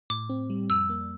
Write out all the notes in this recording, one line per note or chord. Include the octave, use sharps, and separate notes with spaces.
A2 D6
C4
G3
F2 E6
A#3